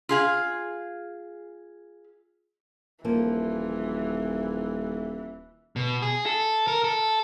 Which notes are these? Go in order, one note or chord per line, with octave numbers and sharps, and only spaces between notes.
F4 G#4 F5
D#1 E3 F3 A#3 A4
B2
G#4
A4
A#4
A4